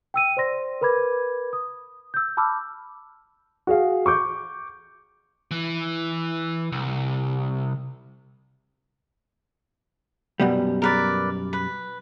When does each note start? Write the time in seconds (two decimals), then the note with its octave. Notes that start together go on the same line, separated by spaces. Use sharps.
0.14 G5 E6 D#7
0.37 C5 D5 C6 A#6
0.81 A#4 B4 B5 D6 G#6
1.53 D#6
2.14 E6 G6
2.37 A5 B5 D6 E6 F6
3.67 F#4 G#4 F5
4.06 C#6 D6 G6
5.51 E3
6.72 C2
10.40 F#2 B2 G3
10.82 A#4 B4 D5
11.53 B4